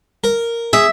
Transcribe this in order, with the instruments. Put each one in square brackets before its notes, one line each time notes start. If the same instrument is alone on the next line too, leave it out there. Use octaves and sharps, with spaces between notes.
[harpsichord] A#4
[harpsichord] G#4 [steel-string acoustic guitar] E5